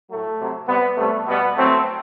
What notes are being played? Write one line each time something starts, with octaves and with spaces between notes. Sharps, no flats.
A2 F#3 A3
C3 F#3
C3 G3 B3
C3 G3 A3
B2 G3 B3
A2 F#3 A3 C4